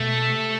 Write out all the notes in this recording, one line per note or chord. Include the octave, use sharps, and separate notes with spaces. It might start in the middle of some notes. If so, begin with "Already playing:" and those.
Already playing: B2 A3
C3